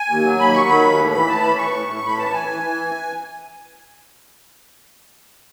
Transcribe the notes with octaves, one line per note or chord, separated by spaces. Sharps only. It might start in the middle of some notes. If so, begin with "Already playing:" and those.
Already playing: G#5
D#2
F#3
D#2 B5
F#3 C#6
D#3 B5
D#2
A2
E3 B5
A2 A5
E3 B5
A2 C#6
A2
A2
C#6
A2 B5
E3 A5
E3 G#5
E3
E3